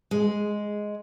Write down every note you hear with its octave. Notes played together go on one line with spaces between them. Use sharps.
G#3